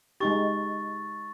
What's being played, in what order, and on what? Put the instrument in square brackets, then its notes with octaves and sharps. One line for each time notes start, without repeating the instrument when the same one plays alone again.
[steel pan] G#3 D#4 G4 [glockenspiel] C#6 A6